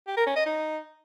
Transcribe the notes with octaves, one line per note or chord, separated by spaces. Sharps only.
G4
A#4
C#4
D#5
D#4